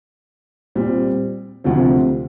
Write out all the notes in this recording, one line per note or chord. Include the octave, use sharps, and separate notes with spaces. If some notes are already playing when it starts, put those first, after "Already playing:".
A#2 G3 C4
D2 C3 F3 C4